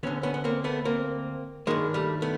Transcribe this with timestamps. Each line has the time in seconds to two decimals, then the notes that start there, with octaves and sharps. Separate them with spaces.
0.03 D2 D3 B3 C#4
0.23 B3 C#4
0.34 B3
0.44 A#3 C4
0.64 A3 B3
0.85 A#3 C4
1.67 G2 D#3 G#3 A#3
1.94 G3 A3
2.22 A3 B3